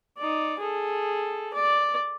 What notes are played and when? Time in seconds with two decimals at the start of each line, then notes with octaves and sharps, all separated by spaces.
0.18 D#4 D5
0.59 G#4 A4
1.54 D5